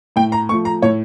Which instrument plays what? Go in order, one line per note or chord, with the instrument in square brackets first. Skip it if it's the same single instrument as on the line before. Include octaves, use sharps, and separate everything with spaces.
[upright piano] A2 G5
A#5
A3 C#6
F3
A#5
A2 C#5